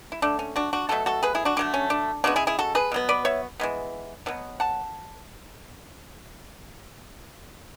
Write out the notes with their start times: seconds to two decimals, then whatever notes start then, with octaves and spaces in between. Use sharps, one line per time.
0.12 E4
0.22 D3 A3 D4
0.39 C#4
0.56 D4 F#4
0.73 D4 F#4
0.89 B2 F#3 A3 F#4 A4
1.06 F#4 A4
1.23 G#4 B4
1.35 E4 G#4
1.45 D4 F#4
1.57 D3 F#3 A3 D4
1.74 C#4
1.90 D4
2.24 C#3 G#3 B3 D4 F#4
2.36 E4 G#4
2.47 E4 G#4
2.59 F#4 A4
2.75 G#4 B4
2.92 B2 F#3 B3
3.09 B4 D5
3.25 C#5 E5
3.60 E3 G#3 B3
4.26 B2 F#3 B3
4.60 F#5 A5